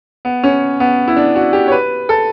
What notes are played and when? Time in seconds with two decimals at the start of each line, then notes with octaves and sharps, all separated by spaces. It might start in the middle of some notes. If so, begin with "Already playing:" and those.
0.25 B3
0.43 C#4
0.80 B3
1.08 E4
1.16 D4
1.36 F#4
1.53 G4
1.68 C#5
1.72 B4
2.09 A4